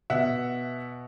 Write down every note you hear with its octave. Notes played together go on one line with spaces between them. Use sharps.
B2 E5 F#5